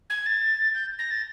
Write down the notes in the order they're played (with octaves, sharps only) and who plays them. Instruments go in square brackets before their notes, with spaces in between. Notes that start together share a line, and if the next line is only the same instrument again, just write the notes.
[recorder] G#6
A6
G6
A#6
A6